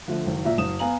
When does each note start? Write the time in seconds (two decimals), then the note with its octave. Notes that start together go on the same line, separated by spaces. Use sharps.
0.08 D3 F3 A3
0.26 F#1 D#3
0.45 A#2 E5
0.58 F#1 D#6 E7
0.79 B3 F5 G#5 A#5 F#7